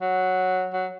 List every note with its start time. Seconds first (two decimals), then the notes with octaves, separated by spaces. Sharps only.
0.01 F#3
0.73 F#3